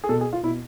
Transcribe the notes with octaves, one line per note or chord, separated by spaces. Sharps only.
G#4
B2 A4
G#4
F4
B2 E4